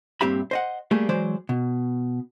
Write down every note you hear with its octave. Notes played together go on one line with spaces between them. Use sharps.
G2 A#2 C4 G4 E5 B5
C5 D#5 F#5
G3 A3 A#3 G#4
E3 F#3 G#3 C5 D5
B2